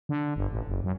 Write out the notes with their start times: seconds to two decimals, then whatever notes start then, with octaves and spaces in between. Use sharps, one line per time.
0.09 D3
0.36 G1
0.52 A1
0.67 F#1
0.84 F#2